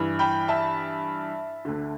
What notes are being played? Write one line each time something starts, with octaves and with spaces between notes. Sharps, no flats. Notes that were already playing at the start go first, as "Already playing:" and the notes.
Already playing: G2 E3
G5 B5
E5 A5
D2 D3